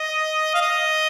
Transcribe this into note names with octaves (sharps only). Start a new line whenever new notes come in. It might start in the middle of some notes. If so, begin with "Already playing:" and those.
Already playing: D#5
F5
D#5